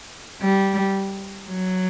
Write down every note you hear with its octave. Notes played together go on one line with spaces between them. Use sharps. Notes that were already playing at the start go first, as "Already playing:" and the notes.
G3
F#3